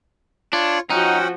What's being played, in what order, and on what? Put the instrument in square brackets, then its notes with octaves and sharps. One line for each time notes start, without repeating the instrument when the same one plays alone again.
[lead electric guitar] D4 [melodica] F4 C#5
[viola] F3 F#4 [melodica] C#4 F#5 G5 [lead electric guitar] D#4